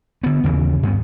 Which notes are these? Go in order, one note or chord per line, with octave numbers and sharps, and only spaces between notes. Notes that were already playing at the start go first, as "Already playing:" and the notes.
D3 B3
D#2 C#3 E3
G2 B3